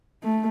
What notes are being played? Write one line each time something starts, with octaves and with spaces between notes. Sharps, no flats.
A3